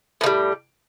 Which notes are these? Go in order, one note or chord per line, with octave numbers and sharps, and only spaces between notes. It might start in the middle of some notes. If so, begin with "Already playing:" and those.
A2 D#3 G3